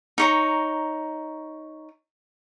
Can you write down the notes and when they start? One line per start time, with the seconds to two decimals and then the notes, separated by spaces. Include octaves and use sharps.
0.18 D#4 C#5 A#5